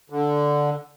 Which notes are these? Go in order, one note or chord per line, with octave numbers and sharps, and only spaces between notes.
D3